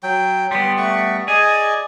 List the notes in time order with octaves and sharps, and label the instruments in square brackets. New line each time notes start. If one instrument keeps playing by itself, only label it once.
[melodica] F#3 G5
[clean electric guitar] G3 B3 [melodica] C6
[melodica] A3 F#5 C#6
[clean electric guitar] G#4 [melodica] D5 D#5 G#5